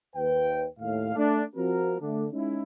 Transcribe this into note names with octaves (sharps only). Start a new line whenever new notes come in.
D#2 B4 G5
D#2 A2 F5
A3 D4
F3 C4 F#4 A#4
D3 A3 D4
G#3 C#4 D#4 E4